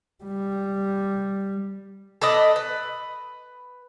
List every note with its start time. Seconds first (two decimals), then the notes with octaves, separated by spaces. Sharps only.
0.24 G3
2.21 A4 B4 D5 D#5
2.56 B4